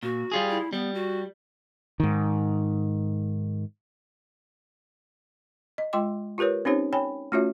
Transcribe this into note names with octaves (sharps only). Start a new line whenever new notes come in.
A#2 F#4
G3 F4 G#4
E4
G3 B3
F#4
G#2 D#3
D#5
G#3 F4 D#5 G5 C6 D6
F4 G4 A#4 B4 C#5
C4 C#4 D#4 G4 C5 C#5
C#5 G5 G#5 B5
A3 C#4 F4 F#4 C#5 E5